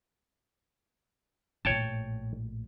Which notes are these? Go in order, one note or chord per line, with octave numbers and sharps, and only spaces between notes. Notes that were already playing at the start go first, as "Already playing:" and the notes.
A#1 A2 C#5 G5 A5